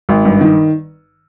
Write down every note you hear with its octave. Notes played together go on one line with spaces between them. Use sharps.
G#1
G2
D#3